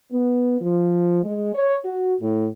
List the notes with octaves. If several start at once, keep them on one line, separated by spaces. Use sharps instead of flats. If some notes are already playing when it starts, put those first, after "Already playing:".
B3
F3
G#3
C#5
F#4
A2